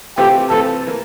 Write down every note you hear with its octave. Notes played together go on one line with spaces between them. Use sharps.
C3 E3 A3 C4 F4 G4
C3 E3 A3 C4 F4 A4
E3 A#3